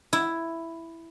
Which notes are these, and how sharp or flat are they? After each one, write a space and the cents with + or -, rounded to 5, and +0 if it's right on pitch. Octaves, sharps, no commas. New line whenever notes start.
E4 +5